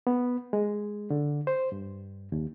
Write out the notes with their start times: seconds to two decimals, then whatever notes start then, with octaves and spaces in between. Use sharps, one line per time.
0.07 B3
0.53 G#3
1.10 D3
1.47 C5
1.72 G2
2.32 D#2